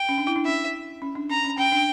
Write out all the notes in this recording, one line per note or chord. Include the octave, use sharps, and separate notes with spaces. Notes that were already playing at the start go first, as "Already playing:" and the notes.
Already playing: G5
C#4
D4
E4
D4
C#4 E5
C#4
D4
C#4 A#5
C#4
C#4 G5
D4